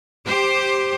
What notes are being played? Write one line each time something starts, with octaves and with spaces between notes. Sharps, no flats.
G4 C5